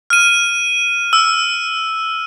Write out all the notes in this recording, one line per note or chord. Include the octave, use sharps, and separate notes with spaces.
F6 D#7
E6